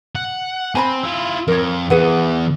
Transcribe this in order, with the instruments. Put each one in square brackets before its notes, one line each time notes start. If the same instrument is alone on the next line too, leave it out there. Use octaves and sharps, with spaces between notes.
[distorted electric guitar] F#5
[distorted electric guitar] C4 [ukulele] G#5 A#5 B5
[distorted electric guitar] E4 F4
[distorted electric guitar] F2 [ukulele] A#4 C#5
[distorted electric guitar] E2 [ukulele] G#4 B4 F#5